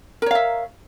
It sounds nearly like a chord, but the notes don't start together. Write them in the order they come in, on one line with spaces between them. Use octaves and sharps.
A#4 C#5 F5 E5